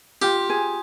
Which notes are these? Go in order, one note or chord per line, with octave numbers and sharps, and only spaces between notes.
F4 G4
G#4